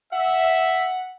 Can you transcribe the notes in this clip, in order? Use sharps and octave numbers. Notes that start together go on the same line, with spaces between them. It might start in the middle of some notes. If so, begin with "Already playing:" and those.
E5 F#5